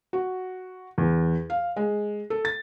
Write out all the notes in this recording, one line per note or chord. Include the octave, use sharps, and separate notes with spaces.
F#4
E2
F5
G#3
A4
A6